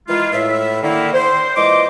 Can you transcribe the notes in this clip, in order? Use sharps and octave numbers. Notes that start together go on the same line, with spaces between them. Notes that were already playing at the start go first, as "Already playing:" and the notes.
D#3 E3 G#3 E4 F4
A2 E5
D3 D#3 A#3 E4
C5
A#2 E3 G#3 D#5 C6 D6